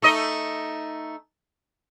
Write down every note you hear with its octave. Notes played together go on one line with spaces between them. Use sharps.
A3 D#4 D#5